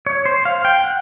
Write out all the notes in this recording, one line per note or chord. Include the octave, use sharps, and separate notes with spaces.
C#5
C5
F5
G5
F#5